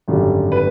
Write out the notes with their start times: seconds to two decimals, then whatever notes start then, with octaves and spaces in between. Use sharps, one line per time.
0.08 G#1 F#2 D3 G3
0.52 B4